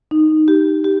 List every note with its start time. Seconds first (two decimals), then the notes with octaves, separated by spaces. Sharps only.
0.11 D#4
0.48 G4
0.84 G4